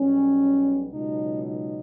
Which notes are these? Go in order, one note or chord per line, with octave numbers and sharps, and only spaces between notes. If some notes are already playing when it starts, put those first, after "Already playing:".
Already playing: B1 B2 G3 C#4
C#2 B2 F#3 D#4
D#4